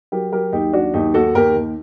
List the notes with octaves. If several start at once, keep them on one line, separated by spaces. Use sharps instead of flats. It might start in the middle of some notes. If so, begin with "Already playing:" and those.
F#3 G4 A#4
F#3 G4 A#4
D#2 D#4 G4
F#3 D4 F#4
D#2 D#4 G4
D#2 F#4 A4
D#2 G4 A#4
D#2